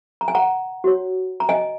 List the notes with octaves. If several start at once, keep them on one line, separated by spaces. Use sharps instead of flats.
A#5
G#5
F#5 A#5
F#4 C#5
A#5
D#5 G#5